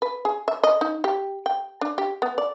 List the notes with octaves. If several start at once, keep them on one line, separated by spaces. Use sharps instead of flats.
B4
G#4
E5
D#5
D#4
G4
G5
D4
G4
B3
D5